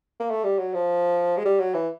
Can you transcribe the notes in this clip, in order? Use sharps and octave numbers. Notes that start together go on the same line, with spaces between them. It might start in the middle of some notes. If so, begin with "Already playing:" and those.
A#3
A3
G3
F#3
F3
G#3
G3
F#3
E3